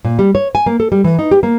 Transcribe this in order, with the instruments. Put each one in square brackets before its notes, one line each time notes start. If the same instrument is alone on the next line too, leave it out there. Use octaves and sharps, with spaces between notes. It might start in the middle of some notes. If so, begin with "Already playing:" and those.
[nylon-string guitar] A#2
G3
C#5
G#5
A#3
A4
G3
E3
D#4
G4
A#3